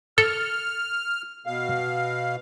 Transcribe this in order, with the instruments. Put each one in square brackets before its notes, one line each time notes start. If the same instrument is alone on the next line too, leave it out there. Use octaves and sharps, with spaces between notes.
[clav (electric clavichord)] A4 [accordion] F6
[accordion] B2 F5